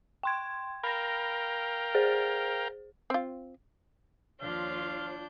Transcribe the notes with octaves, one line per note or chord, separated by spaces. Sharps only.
G5 C6 G#6
A#4 F5 G5 B5 A#6
G#4 C5
C4 F4
D#2 F3 D4 F4 C#5 F5 G6